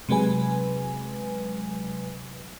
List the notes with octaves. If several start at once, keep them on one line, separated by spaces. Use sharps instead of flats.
C3 F#3 G#3 B4 G#5